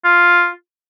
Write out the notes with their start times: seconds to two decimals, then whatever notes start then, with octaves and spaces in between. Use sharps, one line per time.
0.04 F4